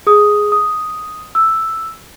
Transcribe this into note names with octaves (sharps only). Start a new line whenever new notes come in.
G#4 D#6
D#6
E6